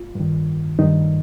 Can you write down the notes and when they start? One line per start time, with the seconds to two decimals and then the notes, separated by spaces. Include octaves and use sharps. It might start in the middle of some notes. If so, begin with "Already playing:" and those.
Already playing: F4
0.15 G2 D#3
0.79 G2 D#3 D#4